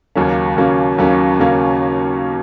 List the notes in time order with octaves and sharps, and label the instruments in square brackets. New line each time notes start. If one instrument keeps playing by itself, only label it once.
[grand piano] D#2 C#3 F#3 A#3 C#4
D#2 C#3 F#3 A#3 C#4
D#2 C#3 F#3 A#3 C#4
D#2 C#3 F#3 A#3 C#4